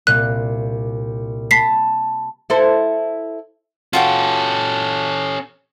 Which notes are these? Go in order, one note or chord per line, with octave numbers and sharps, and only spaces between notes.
C2 A#2 F#6
A5 B5 B6 C7
E4 A4 C5
C#4 F4 F#4 A4 G5